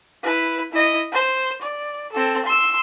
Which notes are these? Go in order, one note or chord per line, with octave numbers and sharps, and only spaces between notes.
E4 B4
E4 D#5
C5
D5
C4 A4
C6 E6